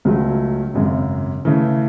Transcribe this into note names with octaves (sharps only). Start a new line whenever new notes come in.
C#2 C#3 F#3 A3
G#1 F#2 C#3
C#3 E3 A3